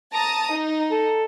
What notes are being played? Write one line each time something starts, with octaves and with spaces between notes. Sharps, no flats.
A5 A#5 D#6
D#4
A4